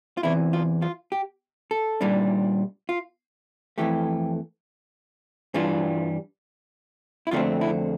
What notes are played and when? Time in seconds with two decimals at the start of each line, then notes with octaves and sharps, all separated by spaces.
0.17 F4
0.23 E2 C3 E3 E4
0.53 F4
0.82 F4
1.12 G4
1.71 A4
2.01 A#2 G3 D4
2.89 F4
3.78 F2 E3 A3 G4
5.54 G2 E3 G3 D4 F4
7.27 E4
7.31 F2 D3 A3 C4 F4
7.61 E4